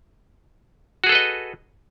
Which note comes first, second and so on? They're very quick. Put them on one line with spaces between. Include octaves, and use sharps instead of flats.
F#4 G#4 A4 B4 D#5